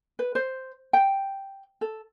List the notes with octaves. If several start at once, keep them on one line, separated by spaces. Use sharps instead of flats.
B4
C5
G5
A4